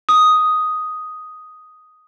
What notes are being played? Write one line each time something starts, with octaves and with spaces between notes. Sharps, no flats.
D#6